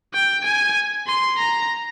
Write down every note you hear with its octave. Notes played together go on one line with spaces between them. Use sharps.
G5
G#5
C6
A#5